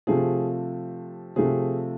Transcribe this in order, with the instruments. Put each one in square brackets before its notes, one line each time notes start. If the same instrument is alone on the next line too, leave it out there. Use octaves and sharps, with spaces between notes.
[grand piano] C3 F3 A3 G#4
C3 F3 A3 G#4